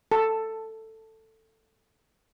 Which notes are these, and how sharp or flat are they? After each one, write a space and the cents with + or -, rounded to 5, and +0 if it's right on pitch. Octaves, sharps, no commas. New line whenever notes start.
A4 +10 A5 +0